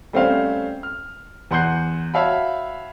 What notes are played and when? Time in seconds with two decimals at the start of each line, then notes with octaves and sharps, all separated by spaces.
0.13 G3 A3 C4 C#4 C5 F5
0.83 F6
1.51 E2 F#5 C6 F#6 G6 C7
2.14 F#4 C#5 E5 F5 A5 B5